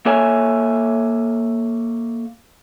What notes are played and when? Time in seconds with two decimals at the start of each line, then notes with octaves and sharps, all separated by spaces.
0.06 A#3 A4 C#5 E5 G#5